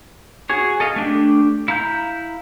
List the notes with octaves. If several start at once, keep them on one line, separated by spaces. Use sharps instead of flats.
F#4 G#4 C#5
A4 D#5 F5
A3 D4 G4
E4 F5 A#5 G6